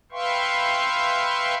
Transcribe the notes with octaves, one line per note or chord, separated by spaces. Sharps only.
B4 E5 F5 G5 C6 C#6